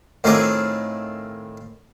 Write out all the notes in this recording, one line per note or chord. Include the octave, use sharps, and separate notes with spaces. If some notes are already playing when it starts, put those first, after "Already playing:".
A2 D#3 C4 F4 G#4 D6